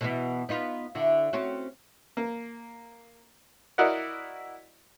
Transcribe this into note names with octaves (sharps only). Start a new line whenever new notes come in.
B2 E3 B3
B3 D#4 F4
D3 E4 F#4
C4 C#4 F#4
A#3
E4 F#4 A#4 D5 D#5 F#5